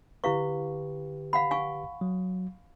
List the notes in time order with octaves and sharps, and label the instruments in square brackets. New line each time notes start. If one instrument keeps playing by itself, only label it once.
[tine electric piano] D3 G4 B4 [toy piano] E4 F5 C#6
[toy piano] F5 F#5 B5
F5 G#5 C#6
[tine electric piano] F#3